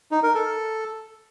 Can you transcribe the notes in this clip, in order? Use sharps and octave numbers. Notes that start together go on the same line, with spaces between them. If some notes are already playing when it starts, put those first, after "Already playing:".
D#4
A#4
A4